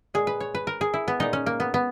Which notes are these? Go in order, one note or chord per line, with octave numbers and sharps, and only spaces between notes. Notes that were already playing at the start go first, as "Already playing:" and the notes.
A#2 G#3 G#4
B4
C#5
B4
A#4
G#4
E4
B3
A#2 G#3 D#4
C#4
A#3
B3
B3